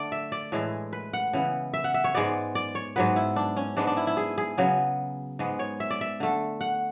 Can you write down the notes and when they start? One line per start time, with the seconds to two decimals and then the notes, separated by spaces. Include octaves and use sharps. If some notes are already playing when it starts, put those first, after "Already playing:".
Already playing: D3 A3 D5
0.12 E5
0.32 D5
0.52 A2 E3 G#3
0.93 B4
1.13 F#5
1.33 C#3 E3 B3
1.74 E5
1.84 F#5
1.94 E5
2.04 C#5
2.14 G#2 G#3 B3 D5
2.55 D5
2.75 C#5
2.96 G#2 F#3 B3 B4
3.16 E4
3.36 D4
3.56 C#4
3.77 G#2 G#3 B3 D4
3.87 D4
3.97 E4
4.07 E4
4.17 G#4
4.38 G#4
4.58 C#3 F#3 B3
5.39 G#2 G#3 B3
5.59 C#5
5.80 E5
5.90 D5
6.01 E5
6.20 D3 A3
6.61 F#5